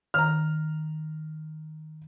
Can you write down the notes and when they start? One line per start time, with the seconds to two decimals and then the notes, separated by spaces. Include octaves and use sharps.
0.14 D#3 A#5 F6